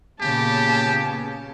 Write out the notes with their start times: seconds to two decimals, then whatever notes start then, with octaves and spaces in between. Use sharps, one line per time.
0.22 A#2 C#3 B3 G4 A5